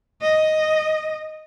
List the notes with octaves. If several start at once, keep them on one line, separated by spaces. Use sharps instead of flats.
D#5